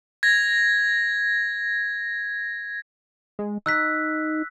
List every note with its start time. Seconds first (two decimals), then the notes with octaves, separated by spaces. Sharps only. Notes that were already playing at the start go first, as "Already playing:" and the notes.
0.23 G#6 A#6
3.39 G#3
3.66 D#4 E6 F#6 B6